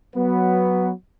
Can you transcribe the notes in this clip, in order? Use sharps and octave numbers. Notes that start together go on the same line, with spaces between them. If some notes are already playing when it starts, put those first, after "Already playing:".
F#3 B3